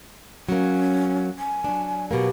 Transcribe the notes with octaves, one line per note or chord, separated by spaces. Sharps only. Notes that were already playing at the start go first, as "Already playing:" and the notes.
F#3 A#3 C#4
G#5
F#3 D4
B2 F#3 A#3 G4